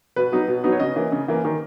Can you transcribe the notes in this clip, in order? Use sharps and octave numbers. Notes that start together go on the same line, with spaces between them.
B2 B4
F#3 B3 D#4
B2
F#3 B3 D#4
C#5
C#3 D#5
E3 A#3
C#3
E3 A#3
D#3